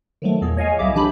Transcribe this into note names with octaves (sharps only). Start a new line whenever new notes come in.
D#3 F3 F#3 A3
E2 A#2 G#4
C#5 D#5 F5 G#5
C2 A2 F#3 G#4 E5 D6
E3 D4 G4 B5